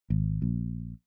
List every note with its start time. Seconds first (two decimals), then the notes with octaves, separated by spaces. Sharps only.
0.10 G#1
0.42 A#1